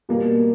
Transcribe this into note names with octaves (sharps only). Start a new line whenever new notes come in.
B2 G3 A#3